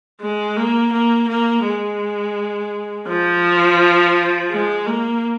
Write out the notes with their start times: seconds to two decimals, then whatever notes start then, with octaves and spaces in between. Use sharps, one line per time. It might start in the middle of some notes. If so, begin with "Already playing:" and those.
0.21 G#3
0.57 A#3
0.93 A#3
1.29 A#3
1.65 G#3
3.07 F3
4.51 G#3
4.87 A#3